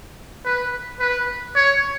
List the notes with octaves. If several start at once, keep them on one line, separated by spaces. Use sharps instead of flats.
B4
B4
C#5